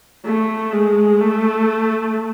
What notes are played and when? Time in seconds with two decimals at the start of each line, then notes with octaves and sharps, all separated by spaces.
0.25 A3
0.73 G#3
1.21 A3